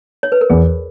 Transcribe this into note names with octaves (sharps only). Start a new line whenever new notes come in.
C#5
B4
A#4
E2 G#4